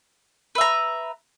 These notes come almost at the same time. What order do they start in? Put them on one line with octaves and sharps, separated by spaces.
B4 E5 A#5